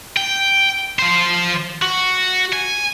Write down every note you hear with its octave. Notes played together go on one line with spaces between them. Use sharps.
G5
F3 C5
F#4
G#5